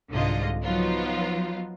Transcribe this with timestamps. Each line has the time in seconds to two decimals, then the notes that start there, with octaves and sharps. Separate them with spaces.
0.10 C2 G#2 D3 F4 D#5
0.64 F3 F#3 B3 D#4 F4